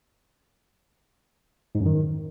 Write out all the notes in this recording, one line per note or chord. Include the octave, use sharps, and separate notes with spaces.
G#2
F#2
D#3